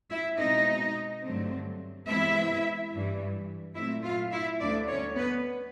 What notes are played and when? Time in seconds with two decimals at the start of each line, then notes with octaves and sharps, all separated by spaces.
0.11 E4 E5
0.38 B2 G#3 C4 D#4 D#5
1.23 G2 D3 F#3 A3 C4
2.07 C3 E3 G#3 B3 E4 E5
2.92 G2 E3 G3
3.76 A#2 F#3 A3 C4 E4 E5
4.04 F4 F5
4.32 E4 E5
4.60 D2 D3 G3 B3 D4 D5
4.89 C#4 C#5
5.16 B3 B4